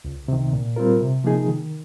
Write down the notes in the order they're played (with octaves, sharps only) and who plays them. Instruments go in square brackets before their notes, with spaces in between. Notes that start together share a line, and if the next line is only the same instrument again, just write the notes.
[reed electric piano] C#2
C3 D#3
A#2
G3 C4 F4 A#4
C3
F3 A#3 D#4 G#4
D#3